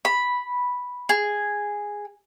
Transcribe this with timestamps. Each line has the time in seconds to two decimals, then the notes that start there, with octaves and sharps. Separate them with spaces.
0.05 B5
1.09 G#4